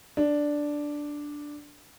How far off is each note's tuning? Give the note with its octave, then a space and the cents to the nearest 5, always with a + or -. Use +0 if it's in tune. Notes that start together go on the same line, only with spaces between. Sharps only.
D4 +0